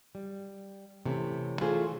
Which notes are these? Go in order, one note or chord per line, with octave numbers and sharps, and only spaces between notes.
G3
C3 E3 A3 C#4
E3 A3 D4 F4 G#4 C5